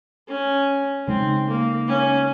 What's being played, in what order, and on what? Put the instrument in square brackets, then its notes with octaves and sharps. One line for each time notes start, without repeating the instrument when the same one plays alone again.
[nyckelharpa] C#4
[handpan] C#3 G#3 D#4 [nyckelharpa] C4
[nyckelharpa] A#3
C#4